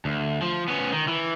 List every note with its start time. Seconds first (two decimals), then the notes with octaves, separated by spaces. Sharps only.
0.05 D2
0.42 F3
0.68 B3 C#4
0.92 D#3
1.08 E3